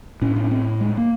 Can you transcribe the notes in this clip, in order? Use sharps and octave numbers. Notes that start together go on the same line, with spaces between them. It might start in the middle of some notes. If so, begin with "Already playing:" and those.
A2 C#4
D4
C#4
C4
G#3
A#3